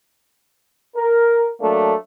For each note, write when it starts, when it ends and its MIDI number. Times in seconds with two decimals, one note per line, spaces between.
0.96 1.47 70
1.61 1.93 54
1.61 1.93 57
1.61 1.93 58
1.61 1.93 62